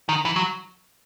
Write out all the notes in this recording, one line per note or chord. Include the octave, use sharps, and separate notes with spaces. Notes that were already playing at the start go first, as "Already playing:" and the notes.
D#3
E3
F#3